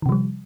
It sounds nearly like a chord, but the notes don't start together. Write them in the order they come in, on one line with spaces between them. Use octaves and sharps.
D#3 C3 F3 G3